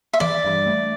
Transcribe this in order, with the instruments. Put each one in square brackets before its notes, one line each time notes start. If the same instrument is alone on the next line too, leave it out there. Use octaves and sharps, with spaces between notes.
[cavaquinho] E5
[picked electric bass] E3 [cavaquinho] D5
[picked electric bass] G2
A3